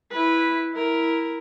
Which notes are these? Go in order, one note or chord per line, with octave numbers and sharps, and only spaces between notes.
E4 B4
E4 A#4